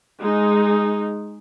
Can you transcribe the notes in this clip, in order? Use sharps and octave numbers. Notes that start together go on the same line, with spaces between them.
G#3 D#4